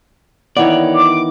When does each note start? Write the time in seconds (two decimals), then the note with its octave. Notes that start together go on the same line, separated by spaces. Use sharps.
0.57 D#3 E3 B3 C#5 D5
0.94 D6